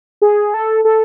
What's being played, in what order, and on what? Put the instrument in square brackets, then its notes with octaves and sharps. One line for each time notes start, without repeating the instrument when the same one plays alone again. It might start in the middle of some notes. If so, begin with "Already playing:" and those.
[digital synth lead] G#4
A4
A4